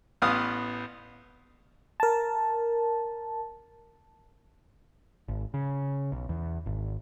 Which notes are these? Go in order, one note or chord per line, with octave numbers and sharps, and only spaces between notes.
A1 B3 F5 D#6
A#4 A5
G#1
C#3
B1
E2
G#1